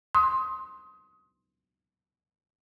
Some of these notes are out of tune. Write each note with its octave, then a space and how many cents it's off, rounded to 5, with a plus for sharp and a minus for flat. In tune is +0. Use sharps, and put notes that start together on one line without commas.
C6 +10 D#6 +25